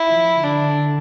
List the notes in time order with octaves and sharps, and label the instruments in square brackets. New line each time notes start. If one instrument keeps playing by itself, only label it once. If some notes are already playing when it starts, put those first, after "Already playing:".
Already playing: [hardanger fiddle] E4
[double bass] F3
[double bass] D3 [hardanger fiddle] D4